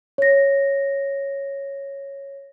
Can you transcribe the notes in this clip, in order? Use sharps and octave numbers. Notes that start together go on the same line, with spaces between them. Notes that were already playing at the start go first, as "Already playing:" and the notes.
C#5 A#6